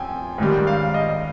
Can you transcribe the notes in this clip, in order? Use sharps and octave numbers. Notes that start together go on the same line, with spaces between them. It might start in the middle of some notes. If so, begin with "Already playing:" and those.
Already playing: F2 G5 G#5
G#2 D#3 G3
F5
D#5